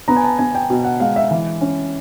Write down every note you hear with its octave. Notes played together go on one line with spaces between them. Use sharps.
B3 A#5
G#5
A5
B3 G#5
G5
B2
F#5
G#3 F5
E5
E3
C#4